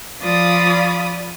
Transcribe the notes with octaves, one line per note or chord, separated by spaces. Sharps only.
F3 F4 D5 B5 D#6